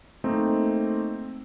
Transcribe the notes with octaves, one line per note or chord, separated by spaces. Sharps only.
A3 A#3 C4 D#4